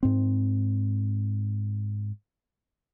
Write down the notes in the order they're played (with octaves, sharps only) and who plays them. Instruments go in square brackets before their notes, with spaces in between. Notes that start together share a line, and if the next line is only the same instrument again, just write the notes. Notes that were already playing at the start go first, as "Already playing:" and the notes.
[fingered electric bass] G#2 C4